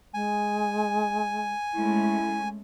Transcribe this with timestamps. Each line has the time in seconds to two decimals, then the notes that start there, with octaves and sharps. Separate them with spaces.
0.14 G#3 G#5
1.74 G#3 A3 C#4 E4